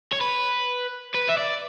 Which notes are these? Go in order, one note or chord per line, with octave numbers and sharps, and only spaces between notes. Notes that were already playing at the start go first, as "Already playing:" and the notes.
C#5
B4
B4
E5
D5